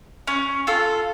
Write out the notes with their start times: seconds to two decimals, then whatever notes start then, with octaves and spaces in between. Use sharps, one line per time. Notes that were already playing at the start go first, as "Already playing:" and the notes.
0.27 C#4
0.67 F4 A4